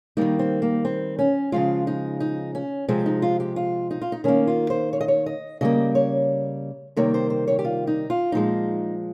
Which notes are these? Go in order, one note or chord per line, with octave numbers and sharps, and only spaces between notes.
D#3 G3 A#3 D#4
C4
A#3
C4
C#4
C#3 F3 G#3 F4
D#4
D#4
C#4
C3 F3 G#3 C4
D#4
F4
G4
F4
D#4
F4
D#4
D#3 A#3 C#4
F4
C5
C#5
D#5
C#5
D#5
C#3 G3 A#3 D#5
C#5
C3 D#3 G3 A#3 C#5
C5
C5
C#5
G4
F4
D#4
F4
A#2 F3 G#3 D#4